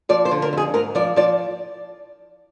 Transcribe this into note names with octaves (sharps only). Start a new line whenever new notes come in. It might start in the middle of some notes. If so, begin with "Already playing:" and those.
F3 D5
C5
D3
A#4
F2 G#4
G#2 A#4
F3 D5
F3 D5